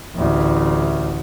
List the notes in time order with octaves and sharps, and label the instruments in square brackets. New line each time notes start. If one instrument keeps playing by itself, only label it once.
[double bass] A1 D2